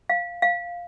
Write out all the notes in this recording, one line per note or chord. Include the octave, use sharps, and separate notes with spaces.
F5
F5